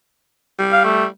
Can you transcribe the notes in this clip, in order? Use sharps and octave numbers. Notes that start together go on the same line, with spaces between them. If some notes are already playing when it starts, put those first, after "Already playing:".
G3
F5
A3